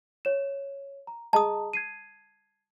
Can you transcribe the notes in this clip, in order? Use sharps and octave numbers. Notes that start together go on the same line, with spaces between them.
C#5 E7
A#5
G#4 D#5 A5 A#5 D#6
G#6 C7 D#7